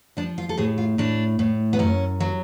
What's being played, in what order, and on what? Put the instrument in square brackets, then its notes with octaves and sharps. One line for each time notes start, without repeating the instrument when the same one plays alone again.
[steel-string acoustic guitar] F3 D4
F4
A4
A2 G#4
F4
A2 D4
A2
B3
F#2 C#4
F#3